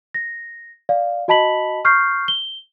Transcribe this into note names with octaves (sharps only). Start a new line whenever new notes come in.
A#6
D5 F5
F#4 D#5 A5 B5 B6 F#7
C#6 F6 G6 C7
G7